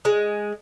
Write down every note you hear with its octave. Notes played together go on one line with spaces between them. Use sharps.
G#3